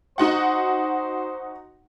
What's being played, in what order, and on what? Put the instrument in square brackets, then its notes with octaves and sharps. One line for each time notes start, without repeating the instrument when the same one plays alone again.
[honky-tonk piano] D#4 F#4 F#5 [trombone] C5